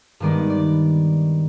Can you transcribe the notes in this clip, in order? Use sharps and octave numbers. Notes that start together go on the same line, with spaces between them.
G2 D#3 G#3 B3 D5
D5